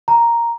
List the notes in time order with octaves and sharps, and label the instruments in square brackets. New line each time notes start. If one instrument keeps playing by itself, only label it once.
[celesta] A#5